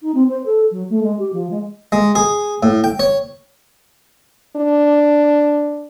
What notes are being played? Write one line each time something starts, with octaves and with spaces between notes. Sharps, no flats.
D#4
C4
C5
A4
F#3
A3
G#3
G4
F3
G#3
G#3
G#4
A2
G5
C#5
D4